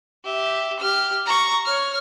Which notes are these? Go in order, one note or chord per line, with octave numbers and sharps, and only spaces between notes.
G4 E5
G4 F6
A#5 C#6
C#5 F6